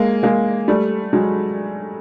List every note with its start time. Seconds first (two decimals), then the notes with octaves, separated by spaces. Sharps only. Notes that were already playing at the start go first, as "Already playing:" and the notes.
Already playing: G#3 A#3
0.23 G#3 A#3
0.68 G3 A3
1.13 F#3 G#3